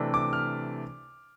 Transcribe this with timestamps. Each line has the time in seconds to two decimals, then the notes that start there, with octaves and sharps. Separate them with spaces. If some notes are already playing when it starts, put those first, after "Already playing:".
Already playing: C3 E3 A3 D4
0.14 D6
0.33 F6